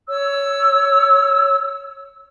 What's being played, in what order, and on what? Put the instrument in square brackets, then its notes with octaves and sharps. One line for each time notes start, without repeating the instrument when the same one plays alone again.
[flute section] C#5 E6